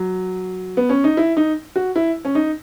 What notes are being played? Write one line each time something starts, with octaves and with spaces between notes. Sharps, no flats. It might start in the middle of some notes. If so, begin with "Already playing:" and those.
Already playing: F#3
B3
C#4
D#4
E4
D#4
F#4
E4
C#4
D#4